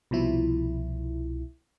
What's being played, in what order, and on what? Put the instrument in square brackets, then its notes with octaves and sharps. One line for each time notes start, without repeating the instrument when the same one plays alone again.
[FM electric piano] C2 B2 F3 E4